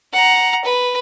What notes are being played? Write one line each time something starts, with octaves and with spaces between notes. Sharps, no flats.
F#5 A#5
B4